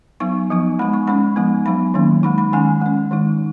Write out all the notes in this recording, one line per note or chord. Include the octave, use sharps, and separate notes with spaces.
F#3 B3 D#4 C#6
F3 B3 D#4
G#3 B3 D#4 B5
C#6
G#3 C#4 B5
F3 G#3 B3 D#4
F#3 B3 D#4 B5
D#3 F#3 A#3 C#4
G#3 D#4 B5
B5
D#3 G#3 C#4 G#5
G#3 C#4
D#3 G#3 D#4